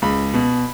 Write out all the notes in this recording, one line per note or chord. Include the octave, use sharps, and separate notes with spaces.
C#2 B5
B2